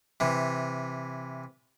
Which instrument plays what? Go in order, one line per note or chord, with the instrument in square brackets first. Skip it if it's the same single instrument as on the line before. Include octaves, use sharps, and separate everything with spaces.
[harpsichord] C3 E3